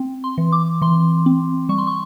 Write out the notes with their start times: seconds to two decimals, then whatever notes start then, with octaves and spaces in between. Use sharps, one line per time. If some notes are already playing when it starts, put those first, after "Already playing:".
Already playing: C4
0.24 C6
0.38 E3
0.52 D6
0.81 E3 C6
1.26 C4
1.69 G3 C#6
1.78 C6
1.87 C#6